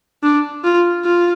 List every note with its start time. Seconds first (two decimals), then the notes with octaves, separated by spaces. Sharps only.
0.23 D4
0.64 F4
1.05 F4